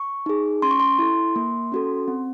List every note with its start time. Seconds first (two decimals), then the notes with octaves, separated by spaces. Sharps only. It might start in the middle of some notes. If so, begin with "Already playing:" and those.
Already playing: C#6
0.26 D#4 G#4
0.62 C#4 C6
0.71 C#6
0.80 C6
0.99 E4 A4
1.36 A#3
1.72 C#4 F#4 A4
2.08 C4